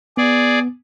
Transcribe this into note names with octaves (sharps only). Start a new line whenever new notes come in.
B3 G#4 D5